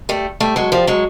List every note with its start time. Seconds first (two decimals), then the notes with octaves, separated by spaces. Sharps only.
0.09 G3 A3
0.40 G3 A3
0.56 F#3 G#3
0.72 F3 G3
0.87 F#3 G#3